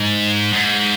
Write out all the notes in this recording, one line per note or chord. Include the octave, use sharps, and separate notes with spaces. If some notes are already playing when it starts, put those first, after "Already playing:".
Already playing: G#2
G#2